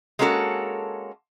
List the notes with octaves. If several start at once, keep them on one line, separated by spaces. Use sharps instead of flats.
G#3 A#3 C#4 F#4 A4